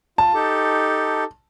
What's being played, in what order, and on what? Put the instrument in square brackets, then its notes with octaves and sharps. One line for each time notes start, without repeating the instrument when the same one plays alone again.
[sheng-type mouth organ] F4 [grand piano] A5
[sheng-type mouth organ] D#4 G4 A4